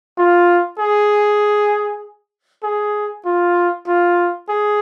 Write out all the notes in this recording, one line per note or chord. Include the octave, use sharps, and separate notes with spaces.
F4
G#4
G#4
F4
F4
G#4